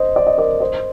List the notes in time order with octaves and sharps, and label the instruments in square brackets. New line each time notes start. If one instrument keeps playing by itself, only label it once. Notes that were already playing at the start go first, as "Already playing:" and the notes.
Already playing: [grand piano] C5 D#5
D5
D#5
A#4 D5
C5 D#5